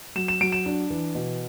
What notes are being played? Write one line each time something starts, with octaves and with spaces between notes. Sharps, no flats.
F#3 E7
E7
F#3 D7
E7
D4
E3
B2